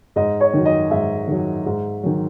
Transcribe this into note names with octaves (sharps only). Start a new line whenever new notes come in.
G#2 D#5
C#5
D#3 F#3
D#5
G#2 E5
D#3 F#3
G#2
D#3 F#3